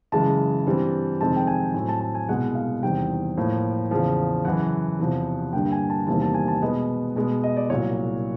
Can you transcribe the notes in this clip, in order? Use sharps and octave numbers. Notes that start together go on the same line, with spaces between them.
F#2 C#3 E3 G#3 A5
G2 E3 G3 C4
F2 C3 D#3 G#3 C4 A5
G5
G#5
A2 F#3 A3 C4 G#5
A5
A5
G#5
C2 B2 G#3 F#5
F5
E2 C3 D#3 G3 G5
A2 F3 A#3
E2 C#3 F3
F#2 C#3 E3 F#5
E2 C3 F3
G2 D3 G3 A#3 G5
G#5
A5
E2 C3 D#3 G3 A#3 A5
A5
G#5
A5
B2 G#3 B3 D#5
B2 G#3 B3
D#5
D5
C2 A#2 F#3 C#5